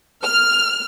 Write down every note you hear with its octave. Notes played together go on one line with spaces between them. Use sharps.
F6